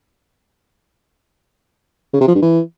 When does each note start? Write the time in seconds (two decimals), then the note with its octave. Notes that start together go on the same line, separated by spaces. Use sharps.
2.13 C#3
2.20 C3
2.28 F3
2.35 G2
2.42 E3